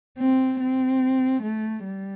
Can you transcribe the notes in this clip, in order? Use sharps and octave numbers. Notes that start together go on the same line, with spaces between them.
C4
C4
A3
G3